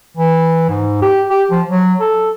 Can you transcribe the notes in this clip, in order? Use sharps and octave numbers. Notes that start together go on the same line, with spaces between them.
E3
G#2
G4
G4
F3
F#3
A4